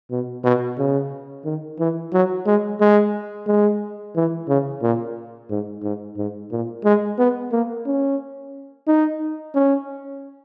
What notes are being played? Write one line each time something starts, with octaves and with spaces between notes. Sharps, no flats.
B2
B2
C#3
D#3
E3
F#3
G#3
G#3
G#3
E3
C#3
A#2
G#2
G#2
G#2
A#2
G#3
B3
A#3
C#4
D#4
C#4